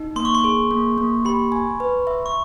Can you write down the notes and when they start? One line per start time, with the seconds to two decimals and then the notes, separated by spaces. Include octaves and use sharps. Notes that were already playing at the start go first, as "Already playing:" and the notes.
Already playing: D#4
0.16 A#3 C6
0.25 C#6
0.35 C6
0.44 G#4
0.71 A#3
0.98 A#3
1.25 G4 B5
1.52 G#5
1.80 B4
2.07 E5
2.26 C#6